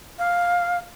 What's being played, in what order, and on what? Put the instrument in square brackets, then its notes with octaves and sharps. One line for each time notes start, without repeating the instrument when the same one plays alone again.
[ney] F5